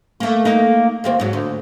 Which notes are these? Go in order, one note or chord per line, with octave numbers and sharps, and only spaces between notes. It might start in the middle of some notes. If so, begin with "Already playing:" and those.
A3 A#3
A#3 D#4 A#4
D#2 A#3 C4
G#2 F#3
D2